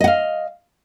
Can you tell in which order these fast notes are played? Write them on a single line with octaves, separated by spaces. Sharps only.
D#5 F#5 F5